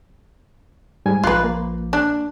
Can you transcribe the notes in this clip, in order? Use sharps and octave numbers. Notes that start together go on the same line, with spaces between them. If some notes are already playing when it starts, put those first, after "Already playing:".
G#2 G3 G#5
A#1 F3 F4 B4 C6 F#6
A#3
D4